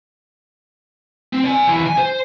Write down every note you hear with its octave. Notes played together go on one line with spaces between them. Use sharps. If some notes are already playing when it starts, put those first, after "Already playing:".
C4
D5 G#5
D#2 E3
G#5
C5